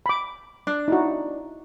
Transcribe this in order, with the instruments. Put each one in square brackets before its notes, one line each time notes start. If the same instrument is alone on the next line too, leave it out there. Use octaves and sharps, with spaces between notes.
[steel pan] B5 D6
[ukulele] D4
[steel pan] D#4 E4 F#4